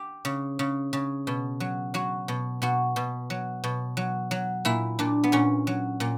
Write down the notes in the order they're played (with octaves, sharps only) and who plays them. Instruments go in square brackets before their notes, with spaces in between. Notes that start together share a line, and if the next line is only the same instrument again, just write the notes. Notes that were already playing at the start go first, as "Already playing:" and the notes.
Already playing: [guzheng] G4
C#3
C#3
C#3
B2
F#3
F#3 F#4
B2
B2 F#4
B2
F#3
B2
F#3
F#3
A#2 E4
A#2 D4
B3
A#2 C#4
F#3
A#2